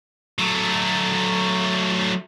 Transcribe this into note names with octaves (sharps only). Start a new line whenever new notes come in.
F#3 A3